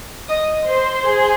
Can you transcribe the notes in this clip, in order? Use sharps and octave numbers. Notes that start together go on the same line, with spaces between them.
D#5 D#6
C5 C6
G#4